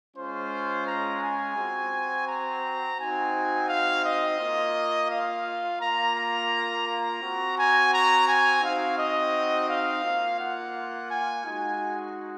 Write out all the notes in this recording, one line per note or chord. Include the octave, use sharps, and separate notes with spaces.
G#3 C#4 F4 C5
A#5
G#5
C4 F#4
A#5
C4 D#4 F#4 G#5
F5
D#5
A#3 F4
F5
A#3 F4 A#5
A#5
A#5
C4 F#4
G#5
A#5
G#5
C4 D#4 F#4 F5
D#5
F5
A#3 F4
F#5
G#5
G#3 D#4 F#4 G#5